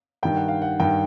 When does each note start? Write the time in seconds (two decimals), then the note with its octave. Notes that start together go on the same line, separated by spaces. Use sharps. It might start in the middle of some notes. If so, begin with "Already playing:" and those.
0.23 G2 D#3 G5
0.36 F#5
0.48 F5
0.62 F#5
0.80 G2 D#3 G5